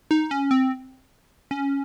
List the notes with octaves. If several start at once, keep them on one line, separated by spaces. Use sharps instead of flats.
D#4
C#4
C4
C#4